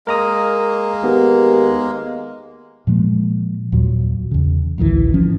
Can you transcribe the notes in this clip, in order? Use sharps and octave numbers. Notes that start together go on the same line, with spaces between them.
G#3 A#3 A#4 A#5 D#6
D#2 B3
A#2 F3 G#3 A#3
D#2 A#2 F#3
E2 C#3
A1 D2 D#3 E3
G#2 F3 C#4